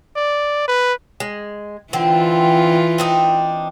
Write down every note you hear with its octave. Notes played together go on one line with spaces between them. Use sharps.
D5
B4
G#3
D3 E3 C4 F4
C4 D4 D#4